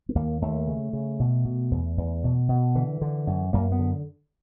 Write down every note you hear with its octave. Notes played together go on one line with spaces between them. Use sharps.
B3
D#2 A#3
D#2 A3
C#3
C#3
B2
B2
E2
E2
B2
B2
D3 E3
D3
F#2
F#2 A#3
B3
D3